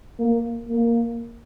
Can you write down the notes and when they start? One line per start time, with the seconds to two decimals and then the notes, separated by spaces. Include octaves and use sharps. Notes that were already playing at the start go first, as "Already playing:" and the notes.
0.19 A#3
0.69 A#3